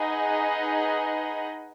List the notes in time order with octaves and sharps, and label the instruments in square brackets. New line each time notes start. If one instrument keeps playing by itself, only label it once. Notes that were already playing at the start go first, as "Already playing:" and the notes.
Already playing: [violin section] D#4 G#4 B4 D#5 F#5